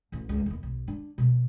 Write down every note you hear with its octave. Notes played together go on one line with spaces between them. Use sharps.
A1 D2
C#2
D#2 B3
B1
D4
B2 F3